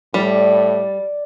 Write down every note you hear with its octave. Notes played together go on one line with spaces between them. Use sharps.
A2 G3 D5